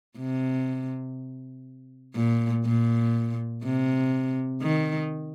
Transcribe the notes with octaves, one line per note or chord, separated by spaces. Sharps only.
C3
A#2
A#2
C3
D#3